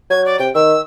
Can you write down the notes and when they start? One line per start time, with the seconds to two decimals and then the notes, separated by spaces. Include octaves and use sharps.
0.10 F#3 G#6
0.25 D5
0.39 C3 G5
0.55 D#3 E6